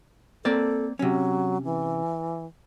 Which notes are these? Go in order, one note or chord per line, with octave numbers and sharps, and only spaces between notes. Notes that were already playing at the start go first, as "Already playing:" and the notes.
A#3 C4 A4 D5
C3 F#3 C#4
E3